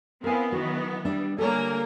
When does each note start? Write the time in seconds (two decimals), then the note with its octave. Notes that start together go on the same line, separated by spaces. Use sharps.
0.24 B3 C4 E4 A#4 F5 G#5
0.52 D#3 E3 F#3 F#4
1.05 G3 D4 E5
1.38 D3 G3 A#3 A4 A#4 C#5 G#5